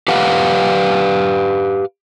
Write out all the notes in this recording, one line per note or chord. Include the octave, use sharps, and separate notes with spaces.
G4 B4 F5 F#5